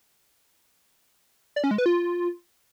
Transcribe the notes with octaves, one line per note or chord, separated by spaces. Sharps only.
D5
C#4
G#3
B4
F4